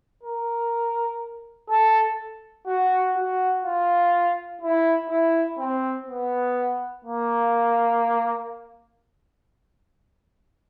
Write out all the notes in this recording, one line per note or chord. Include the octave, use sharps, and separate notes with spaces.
A#4
A4
F#4
F#4
F4
E4
E4
C4
B3
A#3